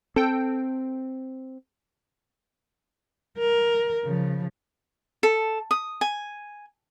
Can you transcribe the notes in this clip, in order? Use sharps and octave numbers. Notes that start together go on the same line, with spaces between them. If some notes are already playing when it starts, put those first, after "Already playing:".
C4 A4 G5
A#4
C#3 F3
A4
D#6
G#5